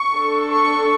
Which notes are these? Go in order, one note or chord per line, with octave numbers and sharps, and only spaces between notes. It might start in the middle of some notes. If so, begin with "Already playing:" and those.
Already playing: C#6
D4 A4
C#6